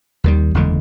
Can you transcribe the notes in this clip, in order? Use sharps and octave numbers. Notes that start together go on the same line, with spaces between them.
D#2 D#3 G3
F#1 E2 D3 G#3